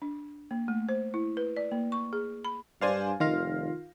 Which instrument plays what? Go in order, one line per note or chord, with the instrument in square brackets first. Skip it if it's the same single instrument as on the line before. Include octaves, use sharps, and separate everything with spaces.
[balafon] D4
A#3
A3
C5
E4
B4
D5
A#3
C#6
G#4
B5
[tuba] G2 [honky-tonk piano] D4 C5 D5 [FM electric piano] F5 G#5
[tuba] F1 [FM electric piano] D#3 F4 F5 [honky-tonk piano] A#6